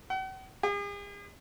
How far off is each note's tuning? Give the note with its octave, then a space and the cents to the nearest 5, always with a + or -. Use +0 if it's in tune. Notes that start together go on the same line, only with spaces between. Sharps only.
F#5 +45
G#4 -45